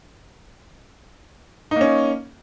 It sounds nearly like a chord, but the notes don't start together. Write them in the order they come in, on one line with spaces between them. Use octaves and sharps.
D#4 A#3 C#4